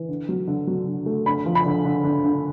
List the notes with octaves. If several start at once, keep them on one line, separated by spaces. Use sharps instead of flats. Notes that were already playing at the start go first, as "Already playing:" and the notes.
Already playing: E3
D3
F#3
D3
F#3
D3
A3
D3 B5
F3
B5
D3
D3
D3
D3